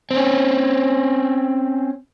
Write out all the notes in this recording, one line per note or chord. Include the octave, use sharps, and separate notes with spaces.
C4 C#4